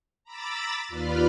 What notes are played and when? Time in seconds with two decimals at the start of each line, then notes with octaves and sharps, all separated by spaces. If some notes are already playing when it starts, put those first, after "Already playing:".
0.24 A#5 B5 D6 E6 A6
0.89 D#2 F4 B4 D5 B5 F6